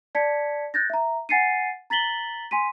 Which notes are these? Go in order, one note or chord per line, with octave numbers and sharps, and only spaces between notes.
D5 A5 G#6 B6 C#7
F#6 G6 A6 A#6
E5 A#5
F#5 G#5 A6 C7 C#7 D#7
A#5 A6 B6 F#7 G7
G#5 C6 B6 D#7